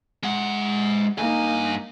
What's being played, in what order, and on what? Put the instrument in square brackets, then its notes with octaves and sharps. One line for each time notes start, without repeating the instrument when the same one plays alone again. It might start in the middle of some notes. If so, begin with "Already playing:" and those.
[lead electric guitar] G#3 F#5
[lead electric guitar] G2 G#5 [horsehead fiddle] A#3 D#4